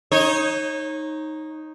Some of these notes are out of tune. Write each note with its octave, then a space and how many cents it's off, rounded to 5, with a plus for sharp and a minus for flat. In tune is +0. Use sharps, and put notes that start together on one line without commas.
D#4 +0 C#5 -30